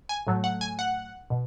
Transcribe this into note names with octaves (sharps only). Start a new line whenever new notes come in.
G#5
A2 F#3 A3
F#5
G#5
F#5
B2